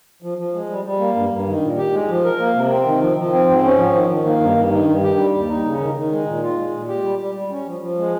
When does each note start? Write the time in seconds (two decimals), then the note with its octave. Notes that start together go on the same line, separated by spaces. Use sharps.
0.22 F3
0.38 F3
0.54 G#3
0.69 G3
0.85 G3
0.99 A#3
1.15 G2
1.30 G2
1.47 D#3
1.61 A#2
1.78 G4
1.92 G#3
2.09 F3
2.24 A#4
2.40 A#3
2.55 C3
2.71 C4
2.86 D#3
3.01 F3
3.17 F3
3.32 C4
3.48 G#2
3.64 C#4
3.78 F3
3.94 D#3
4.10 D#3
4.25 A#3
4.41 G2
4.57 G2
4.71 D#3
4.88 G2
5.03 G4
5.18 G3
5.34 D#2
5.49 D#4
5.65 C#3
5.81 D#3
5.95 D#3
6.12 G#3
6.26 A#2
6.42 F4
6.58 G#3
6.73 A#2
6.88 G4
7.04 G3
7.19 G3
7.35 G3
7.51 C#4
7.67 F3
7.81 F3
7.98 G#3